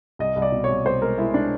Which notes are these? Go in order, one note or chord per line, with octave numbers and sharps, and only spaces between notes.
C2 D#5
C2
D5
B2
C2 C#5
C2 C5
G#3 A#4
G#3 E4
G#3 D4